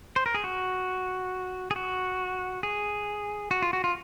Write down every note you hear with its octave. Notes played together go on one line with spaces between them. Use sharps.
C5
A#4
G#4
F#4
G#4
F#4
G#4
F#4
F4
F#4
F4